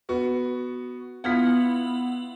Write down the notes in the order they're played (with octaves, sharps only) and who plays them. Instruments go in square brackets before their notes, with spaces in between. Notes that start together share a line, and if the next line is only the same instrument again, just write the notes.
[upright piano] B3 F#4
[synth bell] B3 E4 F#5 [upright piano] F4 F6 B6